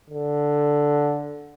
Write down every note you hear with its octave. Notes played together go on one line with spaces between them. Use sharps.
D3